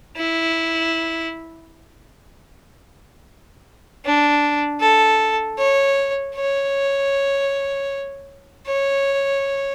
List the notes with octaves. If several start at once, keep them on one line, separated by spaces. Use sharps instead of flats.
E4
D4
A4
C#5
C#5
C#5